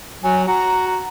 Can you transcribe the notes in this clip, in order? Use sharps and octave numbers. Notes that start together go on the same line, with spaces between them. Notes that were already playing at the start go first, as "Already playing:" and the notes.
F#3 G#5
F#4 A#5